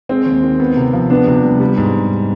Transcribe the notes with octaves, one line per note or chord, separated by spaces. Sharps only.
G#3 C4
D#2
D#3
B3
C3
F3
B3 D4
C3
G3
G3
G#2